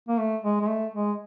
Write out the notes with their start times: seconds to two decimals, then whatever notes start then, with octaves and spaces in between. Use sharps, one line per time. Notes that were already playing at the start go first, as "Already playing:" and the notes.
0.08 A#3
0.19 A3
0.44 G#3
0.61 G#3
0.68 A3
0.94 G#3